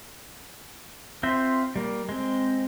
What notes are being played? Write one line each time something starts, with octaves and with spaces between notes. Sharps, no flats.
C4 F4 C5 E5
G3 A#3
G#3 C4